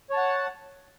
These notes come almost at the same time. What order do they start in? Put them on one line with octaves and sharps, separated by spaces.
C#5 A5 F#5